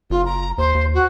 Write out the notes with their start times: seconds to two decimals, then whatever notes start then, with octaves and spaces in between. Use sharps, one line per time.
0.10 F#1 F4
0.25 A#5
0.58 D#2 C5
0.75 D#2
0.94 F#4